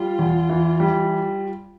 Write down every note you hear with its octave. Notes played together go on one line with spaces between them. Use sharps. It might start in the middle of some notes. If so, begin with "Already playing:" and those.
Already playing: G3 F4
E2
E3
G3